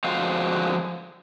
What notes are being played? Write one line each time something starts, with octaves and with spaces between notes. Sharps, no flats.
D3 F3 G#3 C4 F#4 F5